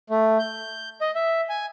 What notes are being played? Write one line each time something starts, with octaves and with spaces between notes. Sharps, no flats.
A3
G6
D#5
E5
G#5